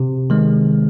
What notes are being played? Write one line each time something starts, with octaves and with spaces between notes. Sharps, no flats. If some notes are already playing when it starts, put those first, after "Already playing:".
Already playing: C3
D#3 G#3